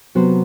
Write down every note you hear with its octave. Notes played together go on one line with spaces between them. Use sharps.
C3 F#3 B3 F#4 C5